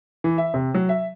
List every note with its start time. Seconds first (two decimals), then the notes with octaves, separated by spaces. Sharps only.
0.24 E3
0.38 E5
0.54 C3
0.74 F#3
0.89 E5